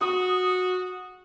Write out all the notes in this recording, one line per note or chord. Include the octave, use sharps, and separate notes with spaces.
F#4 D#6